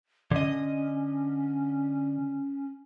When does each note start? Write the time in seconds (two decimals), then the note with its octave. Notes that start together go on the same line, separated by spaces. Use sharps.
0.31 D3 C#4 D#5